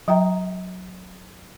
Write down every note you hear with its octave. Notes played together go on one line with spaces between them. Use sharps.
F#3 E5 G5 A#5